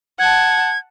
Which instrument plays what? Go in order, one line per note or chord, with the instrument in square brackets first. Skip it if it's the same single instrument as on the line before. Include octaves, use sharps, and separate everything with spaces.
[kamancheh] F#5 A5 [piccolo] G#6